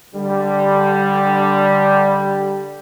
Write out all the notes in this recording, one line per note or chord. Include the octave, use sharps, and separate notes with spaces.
D3 G3